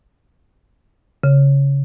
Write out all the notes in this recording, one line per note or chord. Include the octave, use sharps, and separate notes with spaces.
C#3